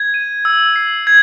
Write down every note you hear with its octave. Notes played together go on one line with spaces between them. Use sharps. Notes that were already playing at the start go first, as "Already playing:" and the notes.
Already playing: G#6
D#7
E6
C7
G#6